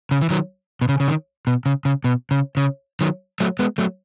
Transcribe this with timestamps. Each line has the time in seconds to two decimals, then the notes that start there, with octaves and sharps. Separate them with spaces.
0.11 C#3
0.21 E3
0.30 D#3 F#3
0.81 B2
0.89 C#3
1.00 C#3
1.08 D#3
1.47 B2
1.66 C#3
1.85 C#3
2.04 B2
2.31 C#3
2.57 C#3
3.01 D#3 F#3
3.40 F#3 A3
3.59 G#3 B3
3.78 F#3 A3